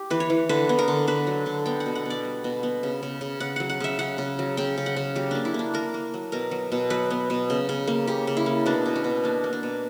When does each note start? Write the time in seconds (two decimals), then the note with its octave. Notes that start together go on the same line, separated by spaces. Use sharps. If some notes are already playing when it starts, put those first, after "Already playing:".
Already playing: G4
0.10 E3 B4
0.20 C#5
0.30 E3
0.49 D3 B4
0.69 B3
0.79 A#4
0.88 D3
1.08 D3 B4
1.27 F#3
1.46 D3
1.66 B3 G5
1.80 F#5
1.86 B2
1.95 F#5
2.05 B2 D5
2.25 G3
2.44 B2
2.63 B3
2.83 C#3
3.03 C#3
3.21 C#3
3.40 C#3 F#5
3.56 F#3 F#5
3.70 F#5
3.80 C#3 E5
3.99 C#3 F#5
4.18 C#3
4.39 F#3
4.57 C#3 G5
4.78 C#3
4.86 F#5
4.97 C#3
5.15 F#3 G4
5.31 A#3 D4
5.45 E4
5.54 A#3 D4
5.74 A#3 A#4
5.94 A#3
6.14 F#3
6.32 B2 A#4
6.51 F#3
6.72 B2
6.90 F#3 B4
7.11 B3
7.30 B2
7.50 C#3
7.69 C#3
7.87 A#3
8.07 C#3 G4
8.27 C#3
8.37 E4
8.46 A#3
8.66 B2 D4
8.86 B2
8.96 C#4
9.04 B2
9.24 A#3 D4
9.44 A#3
9.53 D4
9.63 B2